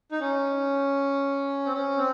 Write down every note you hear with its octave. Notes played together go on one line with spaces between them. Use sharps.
D#4
C#4
C4
C#4
C4